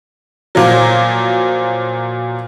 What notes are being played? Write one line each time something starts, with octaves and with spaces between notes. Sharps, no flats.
A#2 F3 F#3